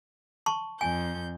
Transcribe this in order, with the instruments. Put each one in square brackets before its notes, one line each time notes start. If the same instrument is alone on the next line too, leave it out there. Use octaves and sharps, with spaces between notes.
[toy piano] A5 C6 C#6
[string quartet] F2 G6 [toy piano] G#5